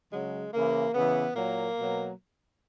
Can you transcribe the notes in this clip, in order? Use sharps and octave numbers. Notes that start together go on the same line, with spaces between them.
C#3 F#3 G#3
C#3 E3 A#3
C#3 E3 B3
A#2 F#3 A#3
B2 F#3